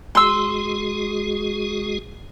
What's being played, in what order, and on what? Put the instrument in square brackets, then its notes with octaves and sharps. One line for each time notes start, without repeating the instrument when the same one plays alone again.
[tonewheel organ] G#3 F#4 G#4 [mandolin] C6 E6